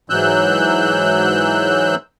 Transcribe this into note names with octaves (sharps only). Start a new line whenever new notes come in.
G#2 E3 F#3 E6 F#6 G6